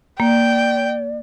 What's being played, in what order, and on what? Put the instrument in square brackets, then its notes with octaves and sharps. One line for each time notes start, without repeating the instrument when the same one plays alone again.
[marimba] A#3 [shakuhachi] D5 [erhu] G5